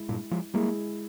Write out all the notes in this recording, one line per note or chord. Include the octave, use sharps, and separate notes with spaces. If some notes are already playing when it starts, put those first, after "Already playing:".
Already playing: G#3 E4 G#4
G2 A#2
F3 G#3
G3 G#3 A#3 E4 G#4